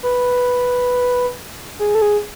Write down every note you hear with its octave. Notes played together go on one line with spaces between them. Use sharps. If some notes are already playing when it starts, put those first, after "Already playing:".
B4
G#4
A4
G#4